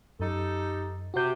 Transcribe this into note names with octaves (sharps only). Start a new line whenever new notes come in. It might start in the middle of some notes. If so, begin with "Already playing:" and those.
F#2 D#4 G4 A4
C3 F#4 G6